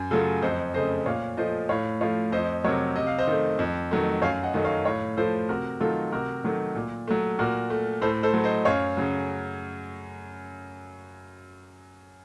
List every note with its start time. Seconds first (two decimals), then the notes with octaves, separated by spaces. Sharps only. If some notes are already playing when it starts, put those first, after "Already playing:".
Already playing: F#2
0.11 C#3 F#3 A3 F4 A4
0.42 F2 C5 D#5
0.74 C#3 A3 C5 D#5
1.06 A#2 C#5 F5
1.37 F3 A3 C5 D#5
1.69 A2 C#5 F5
2.01 F3 A3 C#5 F5
2.32 F2 C5 D#5
2.64 C3 F#3 A#4 C#5
2.96 C3 D#5
3.07 F5
3.18 C5 D#5
3.27 D#3 A3
3.59 F2
3.91 D#3 F#3 A3
4.22 F#2 C#5 F5
4.43 D#5 F#5
4.54 D#3 F#3 A3
4.65 C#5 F5
4.85 A2 C#5 F5
5.17 F3 A3 A4 C5
5.49 C3 F#4 A#4
5.80 D#3 F#3 A3 F4 A4
6.12 C3 F#4 A#4
6.44 D#3 F#3 A3
6.75 A#2
7.08 F#3 A3
7.39 A#2 F#4 A#4
7.70 A3
8.02 A2 A4 C5
8.23 A4 C5
8.34 F#3 A3
8.44 C5 D#5
8.65 F#2 C#5 F5
8.97 C#3 F#3